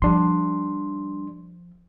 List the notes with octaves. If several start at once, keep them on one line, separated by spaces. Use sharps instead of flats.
F3 G3 D4 C6